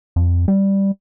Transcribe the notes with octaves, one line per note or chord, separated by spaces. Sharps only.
F2
G3